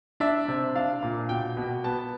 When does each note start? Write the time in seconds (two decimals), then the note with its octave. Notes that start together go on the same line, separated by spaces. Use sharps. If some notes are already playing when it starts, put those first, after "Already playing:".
0.20 D4 E5
0.48 C3
0.75 D4 F5
1.03 A#2
1.29 B2 G5
1.57 B2
1.84 B3 A5